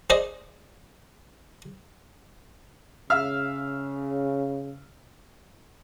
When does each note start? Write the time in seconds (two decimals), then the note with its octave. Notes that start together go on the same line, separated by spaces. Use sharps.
0.10 G#4 C5 D5 D#5
3.10 C#3 E5 F5 F6